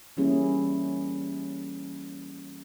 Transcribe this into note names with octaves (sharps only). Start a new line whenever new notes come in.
E3 G3 A#3 C#4 E4 G#4